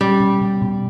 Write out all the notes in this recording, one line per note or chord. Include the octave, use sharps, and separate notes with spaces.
G3 C#4
B2
B2
B2